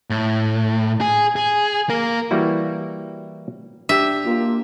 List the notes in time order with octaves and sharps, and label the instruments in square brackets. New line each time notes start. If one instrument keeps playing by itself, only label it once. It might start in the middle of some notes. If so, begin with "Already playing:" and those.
[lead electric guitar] A2
G#4
G#4
A#3 A#4
[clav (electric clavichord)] E3 G3 A#3 E4 F#4
[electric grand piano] D4 G4 [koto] E5
[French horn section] A#3 F4